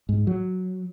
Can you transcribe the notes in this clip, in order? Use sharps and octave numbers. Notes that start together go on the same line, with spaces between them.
G#2
F#3